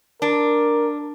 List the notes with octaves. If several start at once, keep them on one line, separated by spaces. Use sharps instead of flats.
D4 A#4